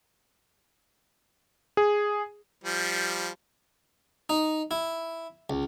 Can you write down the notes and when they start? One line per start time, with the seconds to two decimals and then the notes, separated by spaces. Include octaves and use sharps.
1.77 G#4
2.64 F3 G3
4.30 D#4
4.71 E4
5.50 C#2